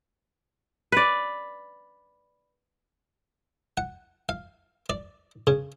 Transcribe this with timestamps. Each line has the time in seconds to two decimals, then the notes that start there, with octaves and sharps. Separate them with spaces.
0.92 B4 D5
3.77 F#5
4.29 F5
4.90 D5
5.47 C#3